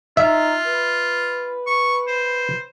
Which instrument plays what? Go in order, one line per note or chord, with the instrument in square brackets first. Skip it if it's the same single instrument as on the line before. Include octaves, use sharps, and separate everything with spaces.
[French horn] D#4 [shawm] F4 [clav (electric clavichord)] E5
[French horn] B4
[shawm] C#6
C5